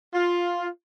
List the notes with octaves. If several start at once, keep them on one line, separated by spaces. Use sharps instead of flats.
F4